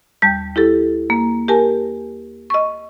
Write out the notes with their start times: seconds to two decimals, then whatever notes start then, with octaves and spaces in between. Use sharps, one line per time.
0.22 D#2 G3 A5 G6
0.56 E4 G4 A4
1.10 A#3
1.48 G4 A#4 G#5 A5
2.50 D#5 C#6